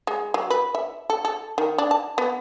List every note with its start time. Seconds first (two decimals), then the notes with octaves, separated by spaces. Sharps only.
0.07 G#3
0.34 F#3
0.50 B4
0.75 E5
1.10 A4
1.25 A4
1.58 D#3
1.78 D4
1.91 A5
2.18 B3